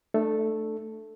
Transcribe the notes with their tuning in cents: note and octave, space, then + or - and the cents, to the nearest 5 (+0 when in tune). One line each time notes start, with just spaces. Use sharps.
A3 +0 D4 +30 A4 +0